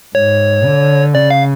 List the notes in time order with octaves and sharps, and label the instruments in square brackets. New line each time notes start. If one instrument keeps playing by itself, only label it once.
[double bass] G#2 [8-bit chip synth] C#5
[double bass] D3
[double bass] C#3 [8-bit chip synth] D5
[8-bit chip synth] F5